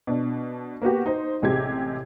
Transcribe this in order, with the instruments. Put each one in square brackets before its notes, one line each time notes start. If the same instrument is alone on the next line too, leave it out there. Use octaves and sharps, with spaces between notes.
[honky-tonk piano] B2 D4
A#3 B3 F#4 G4
D#4 C5
A1 C3 G#3 G4 G#6